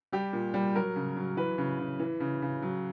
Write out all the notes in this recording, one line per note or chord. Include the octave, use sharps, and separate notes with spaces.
G3 G4
A#2
G3
F#3 A#4
C#3
F#3
E3 B4
C#3
C#3
E3
C#3
C#3
F#3